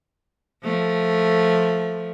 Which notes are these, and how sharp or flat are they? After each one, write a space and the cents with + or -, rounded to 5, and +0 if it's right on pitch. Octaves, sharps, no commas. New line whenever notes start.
F3 +0 A3 +0